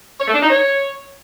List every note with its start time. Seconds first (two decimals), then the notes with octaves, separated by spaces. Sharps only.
0.19 C#5
0.27 A3
0.34 D4
0.42 D#4
0.49 C#5